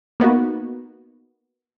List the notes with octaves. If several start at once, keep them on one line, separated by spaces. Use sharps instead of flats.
A#3 B3 D#4 F#4